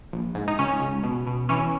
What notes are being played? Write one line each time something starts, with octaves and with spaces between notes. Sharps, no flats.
A#1
G#2
D#4
C#2 C#4
C#2
B2
B2
E3 C#4